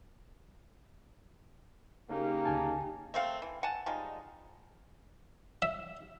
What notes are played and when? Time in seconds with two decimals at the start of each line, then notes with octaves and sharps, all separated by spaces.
2.10 C#3 A#3 D#4 G4
2.45 D2 G#5 A5
3.14 A3 C4 F5 F#5
3.42 E3
3.63 F#5 G#5 A5
3.86 F3 G3 G#3 D#4
5.62 E5